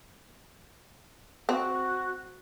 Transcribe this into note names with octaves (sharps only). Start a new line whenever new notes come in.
C4 F#4